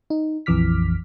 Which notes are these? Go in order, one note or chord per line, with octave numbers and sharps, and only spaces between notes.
D#4
A#1 F2 E3 D6 F6 B6